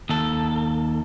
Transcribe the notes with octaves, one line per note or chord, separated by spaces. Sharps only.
D#2 A4